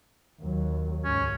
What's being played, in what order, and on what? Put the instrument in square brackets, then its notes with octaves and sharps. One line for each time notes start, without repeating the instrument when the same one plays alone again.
[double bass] D#2 F#3
[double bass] C#2 G#2 [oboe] C#4